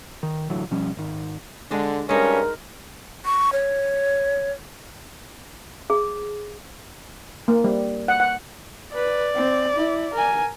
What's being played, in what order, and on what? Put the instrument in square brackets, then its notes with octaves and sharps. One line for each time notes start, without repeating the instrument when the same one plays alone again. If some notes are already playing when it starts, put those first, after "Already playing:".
[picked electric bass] D#3
A1 D3 E3 F#3
B2 F3 G3 C#4
G#1 D#3
[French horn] D3 [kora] G#3 D4
[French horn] G2 [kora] G#3 D#4 [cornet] C#4 [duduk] A#4
[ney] C#6
C#5
[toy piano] G#4
[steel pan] A#3
G3
F#5
F#5
[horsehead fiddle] B4 [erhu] D5
[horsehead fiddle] C4
E4
A#4 G#5